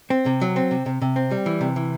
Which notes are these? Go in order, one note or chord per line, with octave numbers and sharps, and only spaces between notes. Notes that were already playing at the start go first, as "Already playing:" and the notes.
C4
C3
F#3
C4
C3
C3
C3
C4
G3
E3
C3
E3